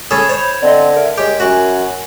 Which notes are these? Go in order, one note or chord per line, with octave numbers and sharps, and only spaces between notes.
C#4 G#4 A4 B5
C5 C#5 G6
D3 C4 D5 D#5
A#4 E5
G#3 G4 C#5
F#2 F#4 G#5